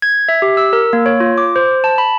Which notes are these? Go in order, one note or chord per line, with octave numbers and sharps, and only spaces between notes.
G#6
E5
G4
E6
A#4
A#3
C#5
F4
D6
C5
A5
B5